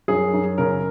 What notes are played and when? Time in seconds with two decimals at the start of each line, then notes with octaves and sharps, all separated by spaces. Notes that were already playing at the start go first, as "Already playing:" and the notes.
0.08 F#2 G#4
0.33 F#2
0.58 C#3 A#4